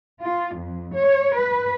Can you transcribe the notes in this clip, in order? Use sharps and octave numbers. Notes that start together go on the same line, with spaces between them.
F4
F2
C#5
B4